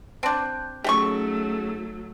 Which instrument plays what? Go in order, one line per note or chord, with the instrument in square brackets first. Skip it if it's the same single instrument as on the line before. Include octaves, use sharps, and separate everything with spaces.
[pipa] C4 D4 [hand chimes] A5 F#6 G6
[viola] F#3 A3 [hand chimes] C#4 D#4 G#4 [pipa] G4 G5 C#6